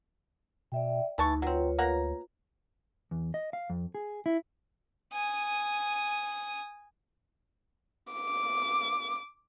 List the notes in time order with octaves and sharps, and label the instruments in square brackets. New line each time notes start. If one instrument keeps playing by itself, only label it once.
[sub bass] B2 [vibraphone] D5 E5 G5
[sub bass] D2 [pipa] E3 A5 C#6 [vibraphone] D#4
[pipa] F#3 C4 [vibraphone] F4 B4 C#5
[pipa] A#3 F#5 A#5
[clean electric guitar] E2
D#5
F5
F2
G#4
E4
[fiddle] G#5 D#6
[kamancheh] D6